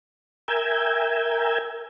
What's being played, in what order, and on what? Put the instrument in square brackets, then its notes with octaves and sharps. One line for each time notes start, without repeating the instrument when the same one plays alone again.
[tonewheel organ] A#4 E5 G5 G#5